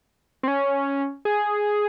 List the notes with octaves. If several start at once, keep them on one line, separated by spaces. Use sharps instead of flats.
C4
C#4
G#4